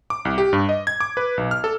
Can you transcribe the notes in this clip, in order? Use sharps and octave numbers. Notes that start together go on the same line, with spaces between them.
D6
C2
G4
G2
D#5
G#6
D6
B4
B1
F6
A4